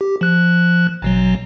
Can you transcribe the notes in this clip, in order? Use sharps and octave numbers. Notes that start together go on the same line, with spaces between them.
G4
F3 F#6
A1 B2 F#3